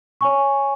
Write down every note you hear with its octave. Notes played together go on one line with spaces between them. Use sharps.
C#5 G#5 C#6